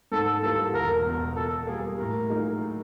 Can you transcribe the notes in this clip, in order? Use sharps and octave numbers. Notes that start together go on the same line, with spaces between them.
G#2 A4
E3 G3 A#3 A4
E1 A#4
E2 B2
B2 A4
G3 A#3 G#4
A2 A#4
F#3 A#3 D#4 G#4